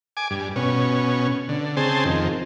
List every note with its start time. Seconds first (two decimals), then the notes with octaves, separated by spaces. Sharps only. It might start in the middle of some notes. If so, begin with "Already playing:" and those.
0.17 G#5 D6
0.31 G2
0.56 B2 C#4
1.49 D3
1.77 C#3 C4 G#4 C5 A5
2.05 F2 D#3